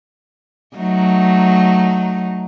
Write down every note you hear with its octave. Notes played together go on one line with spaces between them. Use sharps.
F#3 A3 D#4